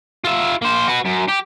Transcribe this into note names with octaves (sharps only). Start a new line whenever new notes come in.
F4 E5
A#3 C5
F#4 B4
F#2
G4